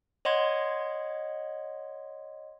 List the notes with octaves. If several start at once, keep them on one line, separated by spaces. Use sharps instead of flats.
C#5 D#5 F#5 C6 G#6